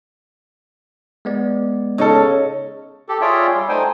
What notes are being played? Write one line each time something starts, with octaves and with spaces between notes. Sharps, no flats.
G#3 B3 D5
C#3 D#4 A4 C#5
G4 A4
F4 G#4 C#5 D5 E5 G5
G3
A3 D#4 C5 G5 G#5